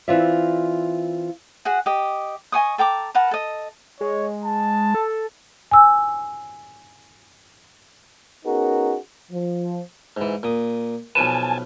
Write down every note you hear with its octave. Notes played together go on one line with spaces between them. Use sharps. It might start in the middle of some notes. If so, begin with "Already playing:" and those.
E3 C4 F4 D5 E5
F#4 G#4 F#5
G4 D#5
D#5 G#5 C#6 D#6
A4 G5 A#5 D6
A#4 B4 F#5 A5
A4 D#5
G#3 C#5
A5
A4
G#5 E6
B3 C#4 D#4 F#4 G#4 A#4
F3
G#2 E3
A#2 D#6
B1 F3 B4 G#5 A5